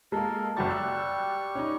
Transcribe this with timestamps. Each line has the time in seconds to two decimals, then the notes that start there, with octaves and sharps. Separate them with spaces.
0.12 G#3 A#3 A4 A#4
0.57 F#1 G3 F#4 G4 C#6 A6
0.70 E6 F#6
1.55 C#4 D#4